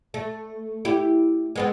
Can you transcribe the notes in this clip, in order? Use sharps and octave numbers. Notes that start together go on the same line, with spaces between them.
A3
E4 G4
G#3 B3 C4